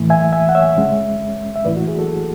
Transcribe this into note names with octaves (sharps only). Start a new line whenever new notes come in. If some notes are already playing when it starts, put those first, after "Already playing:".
Already playing: A2 E3 A3
E5 G#5
E5 G#5
F#5
C#5 E5
D2 C#3 G#3 C#4
E5
A2 E3 A3 E4 B4 D5
F#4
G#4
F#4 A4